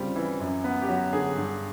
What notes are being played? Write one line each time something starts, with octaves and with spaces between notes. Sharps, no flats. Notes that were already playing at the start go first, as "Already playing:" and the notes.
Already playing: C#3 G3 C4 F4
E3
F#2
B3
G4
F#3 F#4
D3 G#4
G2